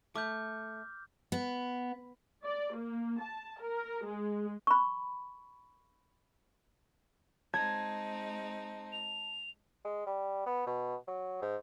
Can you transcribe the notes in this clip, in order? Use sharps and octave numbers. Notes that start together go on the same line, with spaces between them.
A3 D6 F6 G6
B3
D5
A#3
A5
A#4
G#3
B5 C#6
G#3 C4 D#4 A5 G#6
F7
G#3
G3
B3
B2
F#3
G#2